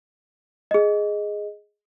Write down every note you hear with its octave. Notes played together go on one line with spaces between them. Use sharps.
G#4 D#5